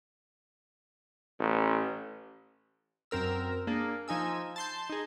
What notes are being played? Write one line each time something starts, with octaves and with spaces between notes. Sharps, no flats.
A1
F#2 C4 A#4 E6
A#3 D4 G#4
F3 D#4 G#5 E6
A5 C6 G6
D#4 G#4